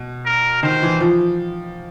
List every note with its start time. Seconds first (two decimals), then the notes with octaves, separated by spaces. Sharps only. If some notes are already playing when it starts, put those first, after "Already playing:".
Already playing: B2
0.26 A#4
0.63 D#3 C5
0.82 E3
1.00 F3